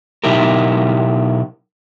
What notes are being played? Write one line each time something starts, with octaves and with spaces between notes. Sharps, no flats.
B2 F#3 D#4 E4 G4 A#4